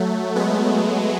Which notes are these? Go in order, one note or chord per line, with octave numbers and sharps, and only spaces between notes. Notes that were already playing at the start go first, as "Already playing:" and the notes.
Already playing: F#3 A3
G#3 B3